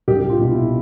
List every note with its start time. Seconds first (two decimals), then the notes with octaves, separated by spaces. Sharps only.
0.08 C2 G4
0.29 F4
0.39 B2
0.51 E4